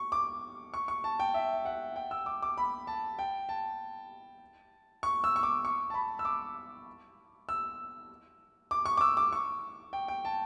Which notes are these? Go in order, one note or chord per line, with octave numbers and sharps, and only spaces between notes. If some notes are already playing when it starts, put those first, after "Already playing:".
Already playing: C#6
D6
C#6
C#6
A5
G5
E5
F#5
G5
E6
D6
D6
B5
A5
G5
A5
C#6
E6
C#6
D6
C#6
A5
B5
E6
D6
E6
D6
C#6
D6
E6
D6
C#6
G5
G5
A5